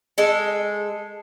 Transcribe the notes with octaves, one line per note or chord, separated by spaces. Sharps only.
G#3 A4